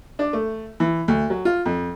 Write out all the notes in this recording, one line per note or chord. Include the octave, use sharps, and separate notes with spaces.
D4
A3
E3
D2
F#3
F4
F2